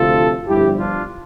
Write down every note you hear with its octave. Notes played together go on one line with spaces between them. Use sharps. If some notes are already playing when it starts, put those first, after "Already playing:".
Already playing: D2 C3 F3 F4 A4
G1 G2 F3 E4 G4
D4 F4